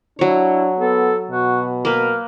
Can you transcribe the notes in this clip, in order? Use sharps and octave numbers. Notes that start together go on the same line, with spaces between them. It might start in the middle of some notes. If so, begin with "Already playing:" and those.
F#3 D4 E4 C#5
B3 A4
B2 F#4
A#3 A#4 B4